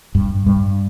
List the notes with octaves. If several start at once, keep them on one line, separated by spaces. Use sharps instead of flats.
G2
G2